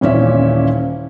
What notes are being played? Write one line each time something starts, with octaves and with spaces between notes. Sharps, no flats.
D#1 A#2 E3 C#4 D5 E5